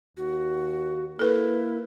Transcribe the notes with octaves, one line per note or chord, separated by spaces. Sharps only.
D#2 F#4
A#3 E4 A4 B4